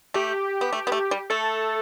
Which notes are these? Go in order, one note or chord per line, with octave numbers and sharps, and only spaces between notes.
A3 G4
B3
A3
B3
A3
G3
A3 A4